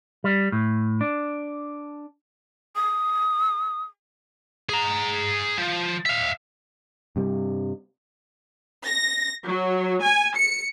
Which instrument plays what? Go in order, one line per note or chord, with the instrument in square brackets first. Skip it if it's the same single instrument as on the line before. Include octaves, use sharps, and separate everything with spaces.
[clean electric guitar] G3
A2
D4
[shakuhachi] D#6
[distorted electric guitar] G#4 A#5
F3
E5 F5
[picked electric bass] G2 C3 G3
[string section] A#6
F#3
G#5
C#7